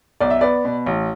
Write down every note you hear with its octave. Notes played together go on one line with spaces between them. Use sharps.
B1 D5
E5
B3 D5
B2
A1